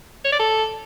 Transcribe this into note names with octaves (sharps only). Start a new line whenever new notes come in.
C#5
D5
A4